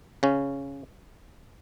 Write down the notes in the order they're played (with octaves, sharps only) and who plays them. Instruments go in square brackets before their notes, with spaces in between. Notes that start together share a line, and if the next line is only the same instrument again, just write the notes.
[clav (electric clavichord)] C#3 C#4